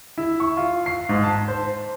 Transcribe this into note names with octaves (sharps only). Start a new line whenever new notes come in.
E4
C#6
F4
C7
G#2
A5
C5